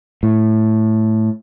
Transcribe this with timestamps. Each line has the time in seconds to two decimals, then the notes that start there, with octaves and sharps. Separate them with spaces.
0.23 A2